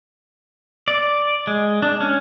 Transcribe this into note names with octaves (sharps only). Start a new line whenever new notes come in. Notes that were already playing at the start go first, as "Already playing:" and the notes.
D5
G#3
D4
C#4